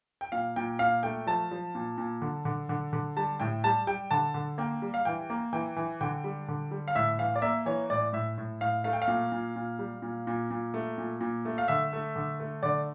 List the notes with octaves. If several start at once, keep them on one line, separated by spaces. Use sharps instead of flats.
G5
A#2 F5
A#2 G5
A#2 F5
A3 G5
F3 A5
F3
A#2
A#2
D3
D3
D3
D3
G3 A5
A2 G5
G3 A5
G3 G5
D3 A5
D3
A#3 G5
G3
F5
E3 G5
A#3
E3 G5
E3
D3 G5
G3
D3
G3
F5
A2 E5
E3 F5
D5
A#3 E5
E3 C#5
A2 D5
A2 E5
A2
A2 F5
A3 F5
G5
F5
A#2
A#2
A#2
G3
A#2
A#2
A#2
A3
A#2
A#2
A3
F5
D3 E5
A3
D3
A3
D3 D5